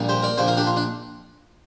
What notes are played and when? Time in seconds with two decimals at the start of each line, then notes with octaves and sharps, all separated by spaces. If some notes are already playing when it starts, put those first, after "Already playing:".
Already playing: A#1 A#2 G3 A#3
0.09 G4 C5
0.22 A#4 D5
0.37 A#1 A#2 A#3 G4 C5
0.47 F4 A#4
0.57 D4 G4
0.67 F4
0.77 D4